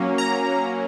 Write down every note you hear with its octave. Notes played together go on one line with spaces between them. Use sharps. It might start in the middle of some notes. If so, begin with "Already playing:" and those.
Already playing: F#3 A#3 C#4
A#5